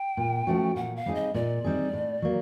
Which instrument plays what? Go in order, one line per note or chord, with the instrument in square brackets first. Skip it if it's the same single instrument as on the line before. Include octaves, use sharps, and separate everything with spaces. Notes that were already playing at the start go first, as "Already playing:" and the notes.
Already playing: [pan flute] G5
[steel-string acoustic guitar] A#2
F3 A3 C#4 F#4
[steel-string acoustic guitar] A#2 [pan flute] F#5
[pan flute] F5
[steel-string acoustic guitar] G3 C4 D#4 G#4
[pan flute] D#5
[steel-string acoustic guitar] A#2 [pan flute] D5
[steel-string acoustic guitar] G3 C4 D#4 G#4
A2
F#3 A#3